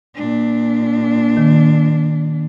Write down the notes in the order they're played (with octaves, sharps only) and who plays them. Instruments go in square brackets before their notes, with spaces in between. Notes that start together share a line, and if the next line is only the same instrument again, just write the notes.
[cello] A#2 D4
[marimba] D#3